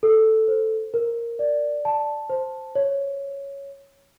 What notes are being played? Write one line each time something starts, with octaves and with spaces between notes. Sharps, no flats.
A4
C5
A#4
D5
A5
C5
C#5